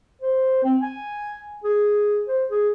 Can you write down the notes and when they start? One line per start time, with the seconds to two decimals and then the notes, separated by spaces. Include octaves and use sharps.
0.22 C5
0.64 C4
0.82 G#5
1.64 G#4
2.28 C5
2.49 G#4